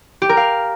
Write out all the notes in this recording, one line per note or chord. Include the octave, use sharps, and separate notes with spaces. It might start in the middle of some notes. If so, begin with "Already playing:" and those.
G4
A#4
F5